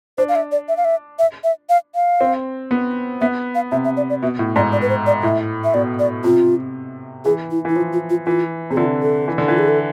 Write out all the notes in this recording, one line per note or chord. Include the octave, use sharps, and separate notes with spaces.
D4 C5
F5
E5
D5
E5
F5
E5
E5
E5
F5
F5
C4
B3
B3 E5
F5
C3 E5
E5
D5
D5
B2 E5
A2
G#2 D5
D5
B4
C5
D5
A2 E5
E5
B2 D5
D5
C3 F4
E3 G#4
E4
E3 E4
F3 F4
F4
F4
E3 F4
C3 G#4
D3 F4
A4
E3
D3
E3 F4
G#4
A4